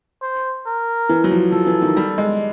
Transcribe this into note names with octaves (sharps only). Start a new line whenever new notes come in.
C5
A#4
E3
F#3
F3
F3 A4
E3
D#3
G3
G#3